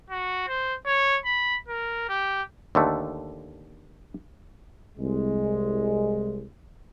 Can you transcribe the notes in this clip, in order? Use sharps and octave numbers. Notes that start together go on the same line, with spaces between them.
F#4
C5
C#5
B5
A#4
G4
D#2 D3 A3
C2 G#3